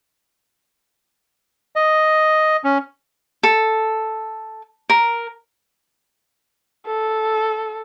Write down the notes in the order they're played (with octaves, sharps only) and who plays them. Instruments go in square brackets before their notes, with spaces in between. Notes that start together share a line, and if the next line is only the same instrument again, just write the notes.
[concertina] D#5
C#4
[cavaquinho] A4
A#4
[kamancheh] A4